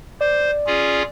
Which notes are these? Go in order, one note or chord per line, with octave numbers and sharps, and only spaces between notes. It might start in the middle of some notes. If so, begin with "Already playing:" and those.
C5 D5
C#4 F4 G#4